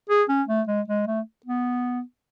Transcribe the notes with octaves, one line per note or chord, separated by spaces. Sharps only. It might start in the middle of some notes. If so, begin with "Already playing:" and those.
G#4
C#4
A3
G#3
G#3
A3
B3